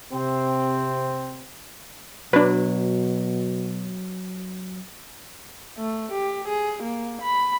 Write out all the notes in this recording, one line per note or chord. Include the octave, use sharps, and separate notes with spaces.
C3 C4
B2 F#3 D4 B4
A3
G4
G#4
A#3
B5